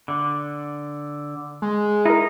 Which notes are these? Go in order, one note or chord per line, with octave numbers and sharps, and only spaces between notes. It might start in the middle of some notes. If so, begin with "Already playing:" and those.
D3
G#3
D#4 E4 A#4